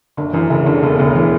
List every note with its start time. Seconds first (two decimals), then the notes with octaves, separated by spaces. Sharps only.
0.17 F#1 D3
0.33 F#2 E3
0.50 F#1 C#3
0.66 F#1 D3
0.83 E1 C#3
0.99 D2 C#3
1.15 E3